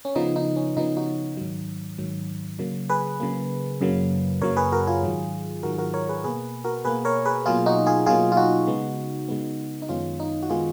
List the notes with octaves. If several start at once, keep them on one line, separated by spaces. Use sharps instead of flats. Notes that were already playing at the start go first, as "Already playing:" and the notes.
C#4
C#3 F3 B3 D#4
D#4
C#4
C#3 F3 B3 D#4
D#4 F#4
G#2 D#3 F#3
G#2 D#3 F#3
C#3 F#3 A#3
G#4 B4
C#3 F#3 A#3
F#2 C#3 F#3 A#3
F#2 C#3 F#3 A#3 A#4 C#5
G#4 B4
F#4 A#4
F4 G#4
G#2 D#3 F#3
G#2 D#3 F#3 F#4 A#4
F#4 A#4
A#4 C#5
G#4 B4
B2 A#3 G#4 B4
F#4 A#4
B2 A#3 G#4 B4
A#4 C#5
G#4 B4
B2 F#3 A#3 F4 G#4
D#4 F#4
F4 G#4
B2 F#3 A#3 F4 G#4
F4
D#4 F#4
C#3 G#3 B3
C#3 G#3 B3
D#4
F#2 D#3 G#3 B3 C#4 F4
D#4
F#4
D#3 G#3 B3 F4 G#4